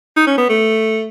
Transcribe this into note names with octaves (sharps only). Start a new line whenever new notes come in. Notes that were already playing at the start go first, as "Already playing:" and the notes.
D#4
C#4
B3
A3